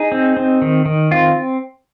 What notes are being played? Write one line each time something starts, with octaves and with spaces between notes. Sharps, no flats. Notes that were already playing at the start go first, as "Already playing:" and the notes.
Already playing: D#4 G#4
C4
C4
D#3
D#3
C4 F4